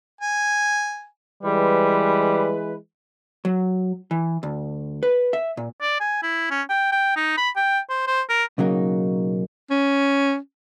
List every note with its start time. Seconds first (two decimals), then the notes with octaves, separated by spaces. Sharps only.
0.21 G#5
1.43 E3 G3 G#3 B4
3.45 F#3
4.11 E3
4.43 D2
5.03 B4
5.33 E5
5.57 A#2
5.81 D5
6.00 G#5
6.22 E4
6.51 C#4
6.69 G5
6.92 G5
7.16 D#4
7.37 B5
7.56 G5
7.90 C5
8.07 C5
8.29 A#4
8.58 B1 C#3 F#3 A#3 D#4
9.71 C#4